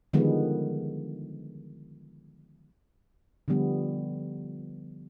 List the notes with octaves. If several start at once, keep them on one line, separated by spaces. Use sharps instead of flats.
D3 D#3 F3 G3 G#3 B3
D3 F3 G3 B3